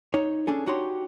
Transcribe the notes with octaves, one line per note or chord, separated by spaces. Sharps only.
D#4 C#5
C#4 D4 G#4 A4
D4 D#4 F#4 G4 C#5 C6